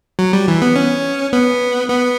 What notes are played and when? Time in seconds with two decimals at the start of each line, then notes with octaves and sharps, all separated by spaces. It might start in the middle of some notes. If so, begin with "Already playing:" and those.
0.19 F#3
0.33 G3
0.48 E3
0.62 B3
0.76 C#4
1.33 B3
1.90 B3